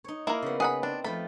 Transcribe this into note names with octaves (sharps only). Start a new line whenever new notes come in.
D#4 C#5
A#3 E4 A#4
C#3 B3
G#4 B4 F#5 B5
C4 D4
F3 A3 B5